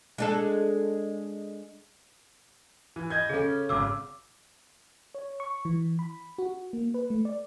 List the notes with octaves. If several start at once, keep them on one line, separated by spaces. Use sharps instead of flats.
G#3 D4 A4
E3
D#5 G6 G#6
C#3 C#4 G#4 A4
G#1 C#3 D6 E6
C#5
C#6
E3
B5
F#4
A#3
B4
A3
D5